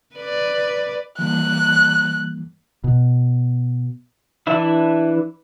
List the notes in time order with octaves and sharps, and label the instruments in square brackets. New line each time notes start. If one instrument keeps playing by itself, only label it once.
[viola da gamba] B4 D5
[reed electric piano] E3 G3 A#3 [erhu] F#6
[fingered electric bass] B2
[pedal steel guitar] E3 D4 E4 E5